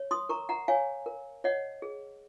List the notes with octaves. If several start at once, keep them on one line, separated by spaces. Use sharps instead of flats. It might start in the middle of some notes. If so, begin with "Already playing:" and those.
Already playing: C#5
C6 D#6
A#4 A#5 C#6
F#5 A#5
C#5 F5 G#5
A#4
C#5 D#5 F#5
G#4